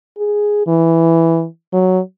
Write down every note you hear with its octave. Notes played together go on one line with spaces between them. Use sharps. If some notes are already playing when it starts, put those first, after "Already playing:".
G#4
E3
F#3